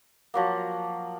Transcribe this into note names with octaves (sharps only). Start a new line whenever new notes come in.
F3 F#3 A#3